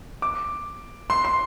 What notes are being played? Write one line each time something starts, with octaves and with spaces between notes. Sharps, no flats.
D6
C6
C6